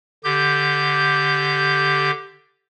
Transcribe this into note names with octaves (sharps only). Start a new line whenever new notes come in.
D3 G4 G6